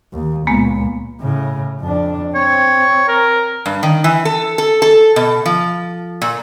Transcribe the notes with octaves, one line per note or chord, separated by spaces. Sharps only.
D#2
C#2 A#2 G#3 A#3 B3
A2 C#3
F2 D4
C4 C#5
A#4
G2
D#3
E3
A4
A4
A4
B2
F3
A#2